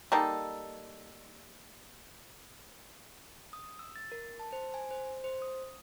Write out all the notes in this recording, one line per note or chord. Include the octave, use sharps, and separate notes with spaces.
G3 A#3 D#4 A4
D#6
E6
A6
A#4
A5
C5
G#5
C5
C5
D#6